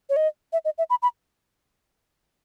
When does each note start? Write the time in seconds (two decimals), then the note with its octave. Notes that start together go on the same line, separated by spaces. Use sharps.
0.09 C#5
0.16 D#5
0.53 E5
0.65 D#5
0.78 E5
0.90 B5
1.02 B5